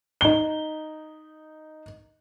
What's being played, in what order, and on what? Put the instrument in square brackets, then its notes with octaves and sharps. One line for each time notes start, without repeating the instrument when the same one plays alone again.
[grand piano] D#4 G7